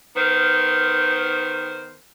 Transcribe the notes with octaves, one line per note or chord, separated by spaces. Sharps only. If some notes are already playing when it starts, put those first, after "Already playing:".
D#3 B3 A#4 C5